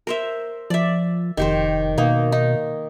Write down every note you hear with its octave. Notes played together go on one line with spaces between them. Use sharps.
A#4 C5 E5
F3 D5 E5
F1 D#3 G4 C5
B2 A#3 D#4
D#4